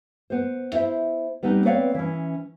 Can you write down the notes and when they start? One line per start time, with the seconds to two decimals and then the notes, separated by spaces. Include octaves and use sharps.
0.30 B3 C5
0.73 E4 C5 E5
1.43 G3 B3 C4 D#4
1.65 B3 C4 B4 C#5 D5 F5
1.94 E3 C#4